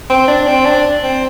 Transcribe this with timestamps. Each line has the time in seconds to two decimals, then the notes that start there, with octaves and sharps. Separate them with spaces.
0.10 C4
0.28 D4
0.48 C4
0.66 D4
1.03 C4